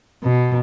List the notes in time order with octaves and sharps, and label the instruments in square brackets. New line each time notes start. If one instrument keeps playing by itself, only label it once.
[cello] B2